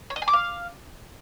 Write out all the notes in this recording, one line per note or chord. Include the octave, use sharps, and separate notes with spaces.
C#5
D#5
G#5
D6
F5